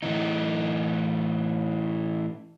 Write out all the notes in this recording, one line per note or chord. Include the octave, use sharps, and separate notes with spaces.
A2 E3 D#4